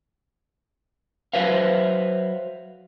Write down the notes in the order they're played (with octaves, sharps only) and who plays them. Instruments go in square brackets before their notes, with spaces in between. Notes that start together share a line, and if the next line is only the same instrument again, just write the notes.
[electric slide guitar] F#3 B4 C5 E5 F5